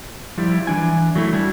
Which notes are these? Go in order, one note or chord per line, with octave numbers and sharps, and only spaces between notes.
F3 G3 E4
E3 D4 G#5
F#3 A3 E4
G3 D4 E4 F#4